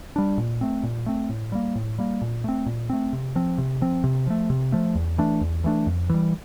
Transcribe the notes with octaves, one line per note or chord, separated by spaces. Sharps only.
G3 D4
A#2
A3 C4
A#2
A3 C4
A2
G3 A#3
A2
G3 A#3
A#2
A3 C4
A#2
A3 C4
C3
F3 C4
C3
F3 C4
C3
F3 A3
C3
F3 A3
E2
E3 A3 D4
E2
E3 A3 D4
F2
E3 G3